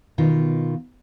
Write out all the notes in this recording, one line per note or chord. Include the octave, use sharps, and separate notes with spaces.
B2 D#3 F4